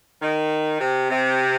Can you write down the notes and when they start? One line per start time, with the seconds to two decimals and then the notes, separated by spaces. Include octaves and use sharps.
0.22 D#3
0.80 C3
1.10 C3